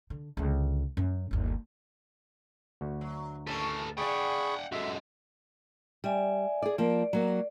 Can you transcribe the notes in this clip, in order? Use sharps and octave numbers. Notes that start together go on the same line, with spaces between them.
D3
C#2 D3
F#2 C#4
G1 D#2
D2 F#4
F#3
A3 A#3 C#4 A4 B4
D3 G#4 D5 F#5 G5 B5 C#6
F#2 G#3 F#4 A4 E5
G3 D5 E5 G#5
G#4 D5
F3 A#3 D5
F#3 A#3